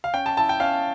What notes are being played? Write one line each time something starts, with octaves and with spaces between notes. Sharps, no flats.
F5
C#4 G5
A5
E4 A5
G5
C#4 F5